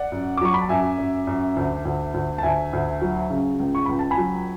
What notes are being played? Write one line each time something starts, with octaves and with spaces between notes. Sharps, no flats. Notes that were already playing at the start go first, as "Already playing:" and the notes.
Already playing: D5 F#5
F#2
D6
F#3 C#6
B5
A5
F#2 E5 G#5
F#2
F#2
D2
D2
D2
A5
D2 E5 G#5
D2
F#3
C#3
C#2
C#6
C#2 B5
A5
G#5 B5
F#3